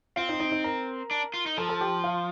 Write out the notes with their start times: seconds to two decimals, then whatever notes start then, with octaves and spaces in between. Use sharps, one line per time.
0.16 C4 F4 F5
0.29 D#4 D#5
0.40 D#4 D#5
0.52 D#4 D#5
0.64 A#4 A#5
1.11 D4
1.34 F4
1.46 D#4
1.57 F3 A4 A5
1.69 A4 A5
1.81 G4 G5
2.04 F4 F5